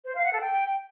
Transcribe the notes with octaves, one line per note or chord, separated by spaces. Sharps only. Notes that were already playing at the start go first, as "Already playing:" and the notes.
C5
F5
F#5
A4
G5